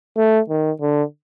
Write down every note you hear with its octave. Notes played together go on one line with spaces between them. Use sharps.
A3
D#3
D3